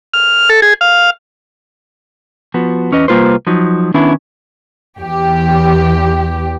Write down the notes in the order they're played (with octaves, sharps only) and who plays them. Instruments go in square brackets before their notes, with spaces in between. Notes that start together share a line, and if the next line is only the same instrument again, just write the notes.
[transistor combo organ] F6
A4
G#4
F5
[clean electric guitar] F3 B3 F#4
E2 C#4 B4 D#5
C2 G3 A#3 F4 B4 C5
F3 F#3 D#4
D#3 B3 C#4 D4 E4
[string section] E2 G4